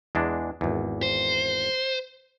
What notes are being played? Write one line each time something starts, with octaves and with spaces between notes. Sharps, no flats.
E2 G#3 D4
G#1 E2
C5